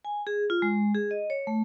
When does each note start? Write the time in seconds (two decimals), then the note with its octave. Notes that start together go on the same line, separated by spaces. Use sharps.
0.05 G#5
0.27 G#4
0.50 F4
0.62 G#3
0.95 G#4
1.11 D#5
1.30 C#5
1.47 A3